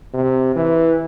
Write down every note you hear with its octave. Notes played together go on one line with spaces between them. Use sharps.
C3
E3